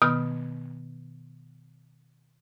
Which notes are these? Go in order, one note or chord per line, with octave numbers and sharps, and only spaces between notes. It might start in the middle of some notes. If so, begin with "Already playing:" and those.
B2 D#3 B3 D#6 F6